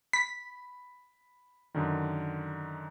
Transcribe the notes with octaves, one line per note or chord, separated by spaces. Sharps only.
B5 B6
F#2 D3 D#3